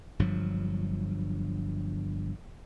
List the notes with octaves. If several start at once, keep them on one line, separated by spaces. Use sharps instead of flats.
G1 G2 F3 F#3